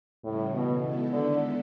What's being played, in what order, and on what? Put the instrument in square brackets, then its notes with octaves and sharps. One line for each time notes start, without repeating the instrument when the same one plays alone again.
[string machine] D#2 C#3 E3 G3 [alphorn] A2
[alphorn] B2
[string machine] D#3 G#3 B3 E4 A4
[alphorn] D3